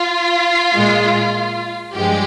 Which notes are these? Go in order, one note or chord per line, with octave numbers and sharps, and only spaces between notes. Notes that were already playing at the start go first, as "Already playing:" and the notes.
Already playing: F4
A#2 G#3
G2 F3 G#3 G4